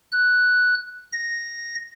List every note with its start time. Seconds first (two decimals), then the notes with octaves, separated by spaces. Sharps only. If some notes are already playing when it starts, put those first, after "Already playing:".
0.12 F#6
1.12 A#6